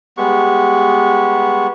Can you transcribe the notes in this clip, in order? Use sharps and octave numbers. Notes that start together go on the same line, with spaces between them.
G3 G#3 B3 C#6